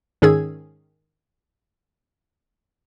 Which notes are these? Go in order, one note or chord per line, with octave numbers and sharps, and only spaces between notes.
G#2 D#3 C#4 G#4 E6 G#6